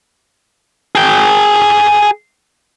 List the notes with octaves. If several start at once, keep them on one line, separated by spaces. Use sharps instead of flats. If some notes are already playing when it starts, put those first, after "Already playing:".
G#4 G5